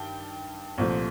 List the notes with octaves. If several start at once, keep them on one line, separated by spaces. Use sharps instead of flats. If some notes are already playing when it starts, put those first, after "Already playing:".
Already playing: G2 D#3 G5 A5
C2 A#2 F3 A3